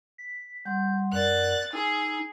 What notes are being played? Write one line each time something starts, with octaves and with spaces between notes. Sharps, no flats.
B6
G3 F#5 C6 G6
F#2 A#4 D5 F#5 F#6 A6
D#4 G#4 E6